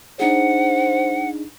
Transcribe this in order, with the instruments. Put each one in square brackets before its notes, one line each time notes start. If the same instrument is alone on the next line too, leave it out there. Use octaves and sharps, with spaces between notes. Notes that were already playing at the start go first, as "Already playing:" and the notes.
[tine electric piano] D4 D#4 G#4 [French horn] C5 [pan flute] F#5